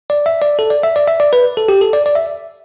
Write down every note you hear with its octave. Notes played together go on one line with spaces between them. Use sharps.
D5
E5
D5
A4
D5
E5
D5
E5
D5
B4
A4
G4
A4
D5
D5
E5